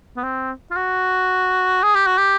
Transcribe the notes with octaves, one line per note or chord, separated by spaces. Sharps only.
B3
C4
F4
F#4
G#4
G4
F#4
G4